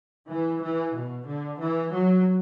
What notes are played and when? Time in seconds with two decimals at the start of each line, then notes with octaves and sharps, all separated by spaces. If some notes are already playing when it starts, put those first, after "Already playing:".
0.29 E3
0.62 E3
0.95 B2
1.27 D3
1.60 E3
1.92 F#3